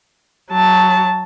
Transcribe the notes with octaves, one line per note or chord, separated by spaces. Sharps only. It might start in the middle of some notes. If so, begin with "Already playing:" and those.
F#3 A5